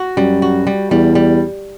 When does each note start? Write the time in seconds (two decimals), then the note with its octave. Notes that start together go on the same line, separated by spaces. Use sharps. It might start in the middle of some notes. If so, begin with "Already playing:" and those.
Already playing: F#4
0.17 F#2 G3
0.42 F#4
0.67 G3
0.91 E2 G3
1.15 G3